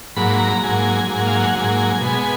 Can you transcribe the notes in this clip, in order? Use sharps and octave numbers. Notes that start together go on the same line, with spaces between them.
G#2 F#3 A#3 B5
A#5
G#2 F#3 A#3 G#5
G#2 F#3 A#3
F5
F#5
G#2 F#3 A#3 G#5
B2 G#3 B3